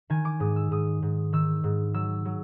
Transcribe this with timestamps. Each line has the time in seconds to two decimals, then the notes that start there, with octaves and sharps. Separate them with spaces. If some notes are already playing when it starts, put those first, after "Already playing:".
0.10 D#3 G#5
0.25 D6
0.40 G#2 D#6
0.56 E6
0.71 G#2 D#6
1.02 G#2
1.33 D#3 E6
1.64 G#2
1.94 F#3 E6
2.25 F#3